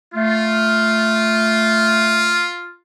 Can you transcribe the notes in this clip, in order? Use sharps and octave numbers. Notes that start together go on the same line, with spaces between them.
A3 F4